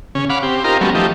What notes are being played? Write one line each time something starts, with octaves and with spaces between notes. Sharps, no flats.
C#3 C#4
F5 F#5 B5 D6
C4 G4
D#4 F4 G4 A#4 C5
F#3 G3 A3 B3 C#4
F3 A3 D#4 G4